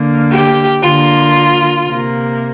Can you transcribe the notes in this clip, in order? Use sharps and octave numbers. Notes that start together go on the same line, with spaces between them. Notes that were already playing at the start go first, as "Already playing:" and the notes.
Already playing: D3 A#3
G4
D3 A#3 F4
C3 A#3